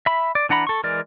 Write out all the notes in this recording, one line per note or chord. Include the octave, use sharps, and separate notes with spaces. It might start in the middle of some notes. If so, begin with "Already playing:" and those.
E5 B5
D5
E3 D4 F#5 A#5 B5
A4 C#6
E3 G#3 A#4 D5